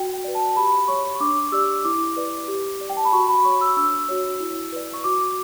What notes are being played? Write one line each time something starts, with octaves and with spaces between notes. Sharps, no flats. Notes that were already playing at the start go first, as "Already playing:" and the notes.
Already playing: F#4 G5
G5
B4 D5
A5
G4 B5
C#5 C#6
C#6
D4 D6
G4 D5 E6
E4 D6
B4 D5
G4
D5
G5
A5
B5
F#4 C#6
B5
C#5 C#6
E6
D4 E6
F#4 C#5
E4
B4 D5
C#6
F#4 D6